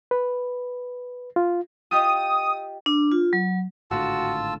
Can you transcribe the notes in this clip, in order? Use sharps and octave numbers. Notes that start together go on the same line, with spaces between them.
B4
F4
F4 G4 D#5 D#6
D4
F4
F#3
G#1 A2 D3 F4 F#4 A5 E6